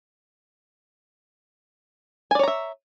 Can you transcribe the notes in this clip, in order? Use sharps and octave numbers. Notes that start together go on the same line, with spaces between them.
C#5 D5 E5 G#5 A#5